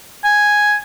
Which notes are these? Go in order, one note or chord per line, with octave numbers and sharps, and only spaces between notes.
G#5